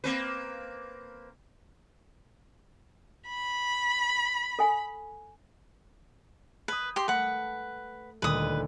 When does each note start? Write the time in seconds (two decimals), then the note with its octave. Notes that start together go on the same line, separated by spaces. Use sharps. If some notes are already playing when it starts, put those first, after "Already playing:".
0.04 A#3 C4 B4
3.27 B5
4.59 A4 G#5
6.68 B4 D#6 G6 G#6
6.96 G4 C6 A#6
7.08 A3 B4 F#5
8.22 D#1 D2 B4 D#6